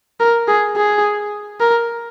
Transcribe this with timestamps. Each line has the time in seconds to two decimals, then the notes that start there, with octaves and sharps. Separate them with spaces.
0.20 A#4
0.48 G#4
0.76 G#4
1.60 A#4